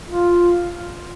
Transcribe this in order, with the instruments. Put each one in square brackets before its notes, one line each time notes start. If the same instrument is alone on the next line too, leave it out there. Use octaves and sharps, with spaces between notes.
[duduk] F4